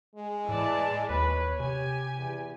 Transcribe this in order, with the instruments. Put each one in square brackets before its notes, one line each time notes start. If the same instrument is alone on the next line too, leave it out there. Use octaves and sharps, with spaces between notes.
[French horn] G#3
[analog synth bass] A2 [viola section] E3 D5 A5
[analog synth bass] D#2 [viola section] B4 [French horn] C#5
[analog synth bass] C3 [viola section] G4 G#5
[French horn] E2